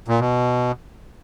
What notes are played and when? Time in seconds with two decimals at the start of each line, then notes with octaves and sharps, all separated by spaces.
0.08 A#2
0.20 B2